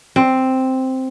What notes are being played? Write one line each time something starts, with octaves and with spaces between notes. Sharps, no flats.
C4